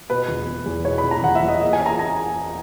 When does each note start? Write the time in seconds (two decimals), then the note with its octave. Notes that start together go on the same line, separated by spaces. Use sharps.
0.10 B2 B4
0.28 E1
0.47 E1
0.66 E2
0.85 B2 C#5
0.98 B5
1.04 E1
1.11 A#5
1.23 E1 F#5
1.35 E5
1.43 E2
1.48 D#5
1.61 A#3 D#5
1.73 G#5
1.79 C#4
1.86 A#5
1.99 A#5